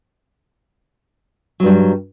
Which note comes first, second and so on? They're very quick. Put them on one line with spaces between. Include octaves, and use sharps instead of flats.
F#3 G2 G3